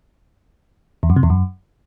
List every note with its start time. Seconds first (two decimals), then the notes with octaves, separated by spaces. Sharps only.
1.03 E2
1.10 F#2
1.16 C3
1.23 E2
1.30 F#2